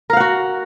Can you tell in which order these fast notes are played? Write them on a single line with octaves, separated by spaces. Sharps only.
A#4 F5 F#5 F#4